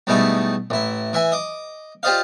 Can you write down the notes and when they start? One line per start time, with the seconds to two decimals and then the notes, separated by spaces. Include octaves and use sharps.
0.07 G#2 B2 G3 A3 D#4 E4
0.70 A1 E4
1.13 E3 E5 G#5
1.32 D#5 D6
2.03 F4 G4 C5 D5 D#5 F5